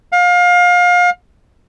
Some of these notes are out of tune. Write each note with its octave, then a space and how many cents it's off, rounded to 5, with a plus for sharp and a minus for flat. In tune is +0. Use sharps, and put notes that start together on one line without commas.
F5 +30